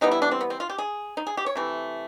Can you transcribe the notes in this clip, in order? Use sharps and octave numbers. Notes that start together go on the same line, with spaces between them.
E3 G3 B3 D#4
E4
D4
C4
B3
C4
F4
G4
G#4
D#4
G#4
G4
C#5
C3 E3 A3